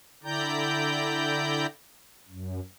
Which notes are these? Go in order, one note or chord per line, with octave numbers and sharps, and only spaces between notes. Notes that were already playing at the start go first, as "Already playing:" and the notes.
D3 E4 D5 G5 A#5 G6
F#2